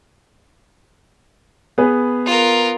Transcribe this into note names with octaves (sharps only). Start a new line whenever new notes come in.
B3 G#4 B4
F4 A#4